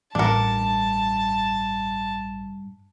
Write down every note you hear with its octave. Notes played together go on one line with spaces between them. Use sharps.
A1 G2 D4 A#4 F#5 A5